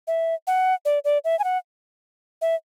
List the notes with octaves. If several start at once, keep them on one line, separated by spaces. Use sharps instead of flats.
E5
F#5
D5
D5
E5
G#5
F#5
E5